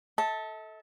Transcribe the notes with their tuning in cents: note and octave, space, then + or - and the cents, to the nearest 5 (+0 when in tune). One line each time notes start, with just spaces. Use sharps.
A4 +0 E5 -45 A5 +0